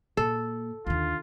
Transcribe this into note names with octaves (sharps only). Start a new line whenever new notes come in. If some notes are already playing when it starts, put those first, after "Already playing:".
A#2 A4
D#2 D3 F4